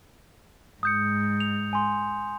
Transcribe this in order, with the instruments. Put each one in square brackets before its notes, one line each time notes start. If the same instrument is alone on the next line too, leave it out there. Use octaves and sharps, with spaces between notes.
[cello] G#2 [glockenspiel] D#6 G6 C#7
[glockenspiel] F7
G#5 C6